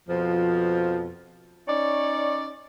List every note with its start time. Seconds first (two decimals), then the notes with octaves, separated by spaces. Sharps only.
0.09 F2 B2 F3
1.68 C#4 D#4 C#5 D5